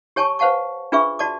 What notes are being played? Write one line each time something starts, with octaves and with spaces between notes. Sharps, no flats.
G4 C#5 G#5 A5 C#6
B4 C5 F5 F#5 A5 C#6
D4 F4 G#4 B4 E5 C#6
F#4 D5 A5 D6